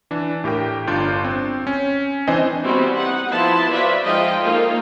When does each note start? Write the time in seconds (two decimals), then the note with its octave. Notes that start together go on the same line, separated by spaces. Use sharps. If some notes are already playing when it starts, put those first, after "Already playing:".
0.11 E3 D4
0.44 A2 G4 A#4 G5
0.87 G1 D4 F4 D5 G6
1.24 C4
1.67 C#4
2.27 E3 C4 D4 C5 D#5 G#5
2.63 G3 B3 C4 E4 F#4 G4
2.94 D#4 F#5
3.30 F3 B3 E4 A5 C6
3.69 F#4 B4 C5 D5 E5 F5
4.03 F3 G#3 D#4 F4 D#5 G5
4.43 A#3 D#4 F4 A4